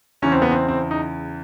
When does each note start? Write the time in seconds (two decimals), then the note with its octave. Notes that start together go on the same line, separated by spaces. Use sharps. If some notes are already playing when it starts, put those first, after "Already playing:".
0.22 E2 C#3 E3 C#4
0.32 C4
0.42 B3
0.51 C4
0.68 C4
0.91 D#4